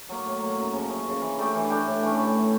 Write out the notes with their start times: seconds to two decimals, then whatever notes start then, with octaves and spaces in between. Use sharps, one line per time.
0.09 F#3 A#3
0.26 A2
0.42 F#3 A#3
0.58 F#2
0.73 C#3 F3
0.90 F#2
1.06 C#3 F3
1.22 E3
1.38 A3 D4 G4
1.55 E3
1.70 A3 D4 G4
1.87 A2
2.02 E3 A3 C#4
2.19 A2
2.36 E3 A3 C#4